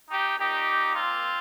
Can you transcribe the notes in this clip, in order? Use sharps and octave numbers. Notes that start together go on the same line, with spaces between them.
D#4 G4
A#2 A#3 D#4 G4
C4 F4